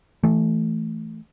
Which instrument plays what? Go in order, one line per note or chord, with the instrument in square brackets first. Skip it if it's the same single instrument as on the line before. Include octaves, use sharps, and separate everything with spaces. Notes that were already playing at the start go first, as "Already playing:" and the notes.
[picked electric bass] E3 A3